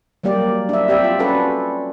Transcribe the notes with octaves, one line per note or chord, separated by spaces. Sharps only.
F#3 G3 A#3 G4 D5
D4 E5
C4 G4 D5 E5
F4
C#4 D4 F#4 A4 B4